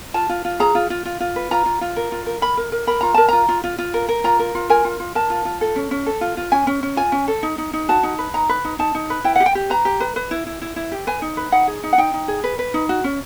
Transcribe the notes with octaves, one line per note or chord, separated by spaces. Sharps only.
F4 A5
F4
F4
G#4 A#5
F4
F4
F4
F4
B4
F4 A#5
F4
F4
A#4
F4
A#4
A#4 B5
A#4
A#4
A#4 B5
F4 A#5
A#4 A5
F4 A#5
F4
F4
F4
A#4
A#4
F4 A#5
A#4
F4
A#4 G#5
F4
F4
A#4 A5
F4
F4
A4
C#4
C#4
A4
F4
F4
C#4 G#5
C#4
C#4
F4 G#5
C#4
A4
D#4
D#4
D#4
F#4 A5
D#4
B4
D#4 A#5
B4
D#4
D#4 A5
D#4
B4
E4 G5
G4 F#5
G5
G4
B4 A#5
G4
B4
B4
E4
E4
E4
E4
G4
B4 G#5
D#4
B4
D#4 F#5
G#4
D#4
F#5
D#4 G5
D#4
G#4
B4
B4
D#4
F#4
C#4